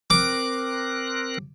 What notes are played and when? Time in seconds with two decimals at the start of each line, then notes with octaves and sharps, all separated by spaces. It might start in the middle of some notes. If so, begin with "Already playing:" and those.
0.10 C4 A#4 D6 F#6